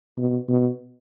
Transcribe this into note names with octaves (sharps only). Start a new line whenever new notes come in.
B2
B2